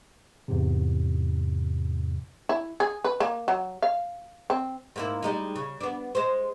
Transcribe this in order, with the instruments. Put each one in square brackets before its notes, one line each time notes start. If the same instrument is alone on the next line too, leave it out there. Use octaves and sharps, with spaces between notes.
[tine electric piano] E2 G#2 C3
[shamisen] E4
G#4
B4
A#3
F#3
F5
C4
[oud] G#2 A#3 E4
G3 G#3 D#4
C#3
B3 D4
G#3 C5